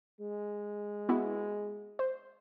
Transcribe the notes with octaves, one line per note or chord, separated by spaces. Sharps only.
G#3
B3 E4 F#4
C5